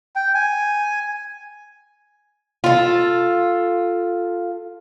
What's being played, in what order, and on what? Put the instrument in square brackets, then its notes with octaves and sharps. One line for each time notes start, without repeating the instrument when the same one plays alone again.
[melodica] G5
G#5
[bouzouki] F4 A4